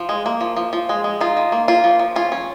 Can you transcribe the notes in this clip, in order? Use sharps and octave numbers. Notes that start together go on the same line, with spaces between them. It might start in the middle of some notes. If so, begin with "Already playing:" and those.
Already playing: F3
G#3
A#3
F3
F3
F3
G#3
G#3
D#4 F4
D#3
A#3
A#3 F4
F3
F3
C#4 F4
C#4